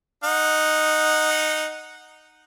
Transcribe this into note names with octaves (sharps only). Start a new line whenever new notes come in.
D#4 F#5